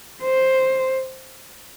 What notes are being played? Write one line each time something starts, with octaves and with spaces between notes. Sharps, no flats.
C5